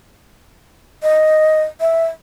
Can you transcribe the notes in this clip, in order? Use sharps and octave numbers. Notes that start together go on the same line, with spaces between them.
D#5
E5